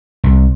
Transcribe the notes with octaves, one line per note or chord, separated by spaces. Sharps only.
C2